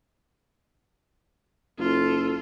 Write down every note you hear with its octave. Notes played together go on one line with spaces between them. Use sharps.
F#1 F4 A4